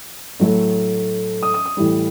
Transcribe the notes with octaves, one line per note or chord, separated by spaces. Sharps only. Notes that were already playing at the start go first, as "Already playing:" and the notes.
A2 F#3 A3
D#6
D#6
D#6
A2 E3 G3